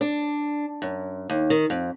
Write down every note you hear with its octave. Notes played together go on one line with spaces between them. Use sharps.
D4
F#2
D#2
D#3
F2